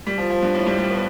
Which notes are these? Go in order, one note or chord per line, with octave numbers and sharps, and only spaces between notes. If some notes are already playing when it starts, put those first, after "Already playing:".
G3
F3
F3
G2
A2
G3
G3
B3